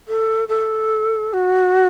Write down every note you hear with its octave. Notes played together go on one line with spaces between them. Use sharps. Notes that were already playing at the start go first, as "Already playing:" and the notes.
A4
A4
F#4